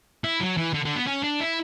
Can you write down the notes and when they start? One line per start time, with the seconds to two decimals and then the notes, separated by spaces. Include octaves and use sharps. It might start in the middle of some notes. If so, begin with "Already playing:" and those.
0.24 E4
0.40 F#3
0.57 E3
0.74 D3
0.85 D3
0.96 B3
1.07 C#4
1.24 D4
1.41 E4